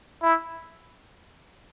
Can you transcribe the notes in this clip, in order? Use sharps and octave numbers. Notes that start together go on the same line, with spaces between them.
E4